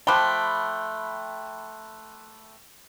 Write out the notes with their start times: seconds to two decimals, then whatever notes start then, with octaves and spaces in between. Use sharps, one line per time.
0.07 F3 A3 G5 B5 C6 D6 F#6 G7